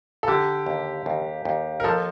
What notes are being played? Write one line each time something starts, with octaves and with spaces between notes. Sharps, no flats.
A4
D3 G4
D#2
D#2
D#2
A#4
F3 A4